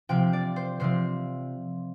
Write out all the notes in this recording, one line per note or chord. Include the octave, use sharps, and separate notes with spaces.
C3 F3 C4 G5
D5
C5
C3 F3 C4 C5